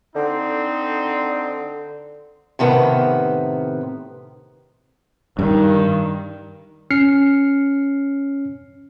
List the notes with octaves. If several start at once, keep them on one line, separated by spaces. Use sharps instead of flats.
D3 C4 D#4
A2 C3 D#3 B3
G2 D#3
C#4 F6 C7 C#7